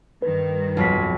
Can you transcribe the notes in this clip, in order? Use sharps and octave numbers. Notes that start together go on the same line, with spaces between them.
G2 D#3 B4
B1 F2 B6